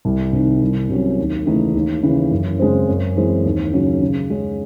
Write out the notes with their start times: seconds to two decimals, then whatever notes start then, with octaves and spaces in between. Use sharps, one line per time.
0.05 C2
0.33 C3 D#3
0.61 C2
0.89 C3 F#3 C#4
1.18 D#2
1.46 C#3 E3 A3 D#4
1.74 D#2
2.03 C#3 E3
2.31 F#2
2.59 C#3 G#3 C4
2.87 F#2
3.17 E3 G#3 C4
3.44 D#2
3.73 C#3 F#3 C#4
4.02 C#3
4.30 G#3 C#4